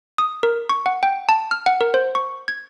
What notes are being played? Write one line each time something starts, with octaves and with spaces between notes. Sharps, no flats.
D#6
A#4
C#6
F#5
G5
A5
F6
F#5
A#4
C5
C#6
G#6